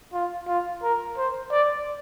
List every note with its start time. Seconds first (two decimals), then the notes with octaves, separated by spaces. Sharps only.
0.13 F4
0.48 F4
0.83 A#4
1.17 C5
1.52 D5